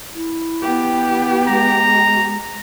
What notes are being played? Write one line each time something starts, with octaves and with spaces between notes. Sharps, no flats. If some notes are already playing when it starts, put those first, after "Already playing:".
E4
B3 G4
G#3 A#5